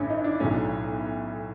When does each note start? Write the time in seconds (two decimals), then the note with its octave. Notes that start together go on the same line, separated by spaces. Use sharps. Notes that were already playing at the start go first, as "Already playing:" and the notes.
Already playing: A1 G2 D3 C#4
0.10 D#4
0.24 D4
0.40 B1 A2 F#3 A3 C#4